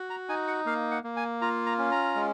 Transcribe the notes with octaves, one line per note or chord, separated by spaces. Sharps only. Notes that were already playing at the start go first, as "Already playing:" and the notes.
Already playing: F#4
A#5
D#4 G#5
F#5
A#3 F5
F#5
A#3
G#5
F4 A#5
A#5
C#4
A#5
G#3